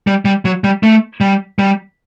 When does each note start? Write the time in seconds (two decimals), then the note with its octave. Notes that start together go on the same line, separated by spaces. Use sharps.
0.07 G3
0.25 G3
0.45 F#3
0.64 G3
0.83 A3
1.21 G3
1.59 G3